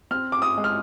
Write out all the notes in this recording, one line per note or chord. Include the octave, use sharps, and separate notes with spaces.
C4 F6
D6
D#6
G#3
F6